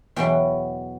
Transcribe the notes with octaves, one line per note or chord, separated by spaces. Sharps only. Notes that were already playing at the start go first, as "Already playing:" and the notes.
E2 B2 F#3 G5